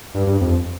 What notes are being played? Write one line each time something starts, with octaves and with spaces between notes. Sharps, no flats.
G2
G2
F2